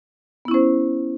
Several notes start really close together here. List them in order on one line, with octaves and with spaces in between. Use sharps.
B3 E4 C#4 C5